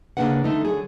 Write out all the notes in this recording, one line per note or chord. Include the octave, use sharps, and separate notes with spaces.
C#3 A3 A#3 D4 B4 F#5
D3 A3 D#4
D3 F#3 G#4